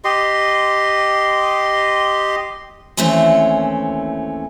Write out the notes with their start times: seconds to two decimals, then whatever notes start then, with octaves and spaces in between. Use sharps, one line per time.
0.04 G4 D#5 C6
2.97 D#2 E3 A3 C4 C#4